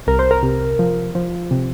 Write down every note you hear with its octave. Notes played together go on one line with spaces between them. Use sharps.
C2 A#4
C5
A#4
C3
F3
F3
C3